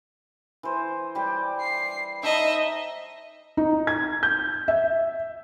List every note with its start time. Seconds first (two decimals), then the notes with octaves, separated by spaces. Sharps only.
0.63 E3 C5
1.15 G3 G4 D5
1.61 C7
2.23 D#4 D#5 E5 A5
3.57 D#4
3.87 G#6
4.23 G6
4.68 E5